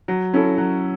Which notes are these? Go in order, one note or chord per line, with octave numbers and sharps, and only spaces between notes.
F#3
C#4 E4 A4
F#3